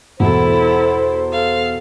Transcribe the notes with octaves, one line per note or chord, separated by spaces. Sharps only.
E2 B2 E4 A4 C5
A4 F5